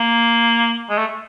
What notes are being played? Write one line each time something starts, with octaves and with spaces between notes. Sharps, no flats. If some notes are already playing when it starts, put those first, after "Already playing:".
Already playing: A#3
G#3
A3